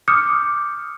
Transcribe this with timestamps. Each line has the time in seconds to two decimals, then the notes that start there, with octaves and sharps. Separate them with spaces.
0.08 D6 D#6 F6 G6 C#7